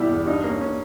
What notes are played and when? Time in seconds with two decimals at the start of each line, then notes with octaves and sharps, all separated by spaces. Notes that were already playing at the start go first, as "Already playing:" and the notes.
Already playing: B2 G3 E4 G4
0.09 E2
0.26 G2 D#4
0.44 A#3
0.49 C#4
0.61 C#4